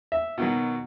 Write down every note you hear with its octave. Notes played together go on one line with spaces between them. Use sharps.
E5
B2 D#3 F#3